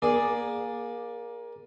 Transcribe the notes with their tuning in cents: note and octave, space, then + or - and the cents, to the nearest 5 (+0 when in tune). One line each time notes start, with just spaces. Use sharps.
A#3 +20 G#4 -5 D5 +0